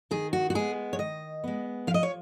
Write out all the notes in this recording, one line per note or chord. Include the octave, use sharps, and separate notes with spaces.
D#3 G#4
F#4
F#4
G#3 B3 G#4
C#5
D#3 D#5
G#3 B3
F3 F5
D#5
C#5